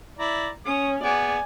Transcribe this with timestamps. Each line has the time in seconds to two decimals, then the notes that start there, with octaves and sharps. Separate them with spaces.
0.19 E4 D5 A#5
0.65 C#4 C#5 D#6
1.03 B3 G#4 D5 G#5